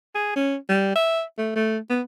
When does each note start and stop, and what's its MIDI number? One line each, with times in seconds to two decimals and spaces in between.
0.15 0.35 68
0.36 0.56 61
0.69 0.92 55
0.95 1.23 76
1.38 1.53 57
1.56 1.78 57
1.90 2.01 59